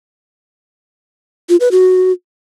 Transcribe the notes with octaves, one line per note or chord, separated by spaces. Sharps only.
F4
B4
F#4